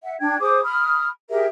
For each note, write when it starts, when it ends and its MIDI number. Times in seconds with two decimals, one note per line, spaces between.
0.02 0.15 76
0.02 0.15 78
0.19 0.37 62
0.19 0.37 79
0.19 0.37 92
0.40 0.61 68
0.40 0.61 72
0.40 0.61 86
0.40 0.61 87
0.63 1.08 83
0.63 1.08 87
0.63 1.08 89
1.29 1.46 67
1.29 1.46 68
1.29 1.46 70
1.29 1.46 76